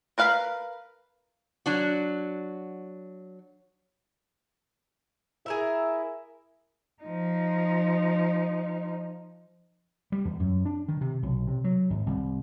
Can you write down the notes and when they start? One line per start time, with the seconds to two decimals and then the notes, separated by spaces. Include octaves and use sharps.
0.18 A#4 B4 F5 F#5 B5
1.66 F#3 D4 F#4
5.46 E4 G#4 A#4 E5
7.03 F3 D#4
10.12 G3
10.25 E2
10.39 F#2
10.65 D4
10.88 D#3
11.01 C3
11.23 B1
11.47 C3
11.64 F#3
11.90 G#1
12.06 C2